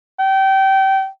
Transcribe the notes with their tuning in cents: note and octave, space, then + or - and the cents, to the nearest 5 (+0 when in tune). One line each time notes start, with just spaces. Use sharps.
G5 -25